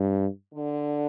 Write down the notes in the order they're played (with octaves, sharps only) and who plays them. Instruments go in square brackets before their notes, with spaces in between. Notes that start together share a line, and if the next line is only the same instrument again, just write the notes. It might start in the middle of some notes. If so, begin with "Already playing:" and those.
Already playing: [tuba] G2
[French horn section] D3